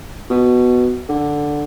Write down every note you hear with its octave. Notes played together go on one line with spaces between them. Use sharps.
B2
D3